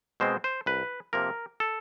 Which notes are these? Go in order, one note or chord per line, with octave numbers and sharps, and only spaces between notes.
B2 G#3 C4 C5
C5
C2 B4
C3 F3 A#3 A#4
A4